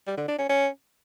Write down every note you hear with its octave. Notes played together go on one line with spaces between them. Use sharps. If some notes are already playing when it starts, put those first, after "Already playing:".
G3
D3
D4
C#4
C#4